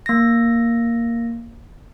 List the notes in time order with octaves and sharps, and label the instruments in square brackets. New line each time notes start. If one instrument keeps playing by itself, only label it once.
[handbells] A#3 A#6